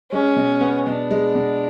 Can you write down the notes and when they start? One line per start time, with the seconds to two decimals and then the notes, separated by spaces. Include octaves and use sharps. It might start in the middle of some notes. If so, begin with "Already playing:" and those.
0.12 G#3 C#4
0.36 B2
0.61 B3
0.87 B2 D4
1.11 G#3
1.35 B2